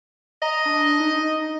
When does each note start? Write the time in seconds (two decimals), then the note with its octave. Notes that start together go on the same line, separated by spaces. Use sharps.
0.42 D#5 A#5
0.65 D4
1.00 D#4